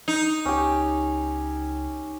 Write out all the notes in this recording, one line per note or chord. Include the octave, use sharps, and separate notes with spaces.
D#4
C#2 C#4 G4